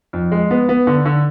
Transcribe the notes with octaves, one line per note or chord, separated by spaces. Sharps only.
F2
G#3
B3
B3
D3
D3